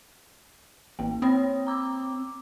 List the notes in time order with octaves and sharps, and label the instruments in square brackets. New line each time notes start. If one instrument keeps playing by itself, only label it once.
[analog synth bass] A1 [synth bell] A#3
[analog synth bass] C4 [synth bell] C#5 B5 D#6
[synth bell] A#5 D6 E6